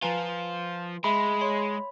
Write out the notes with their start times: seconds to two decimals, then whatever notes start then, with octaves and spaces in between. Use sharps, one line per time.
0.02 F3 F4 B4 G#5 A#5
1.04 G#3 E5 B5
1.41 C#5 C6